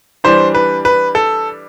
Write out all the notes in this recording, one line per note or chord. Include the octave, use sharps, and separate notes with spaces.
E3 G3 D4 C5
B4
B4
A4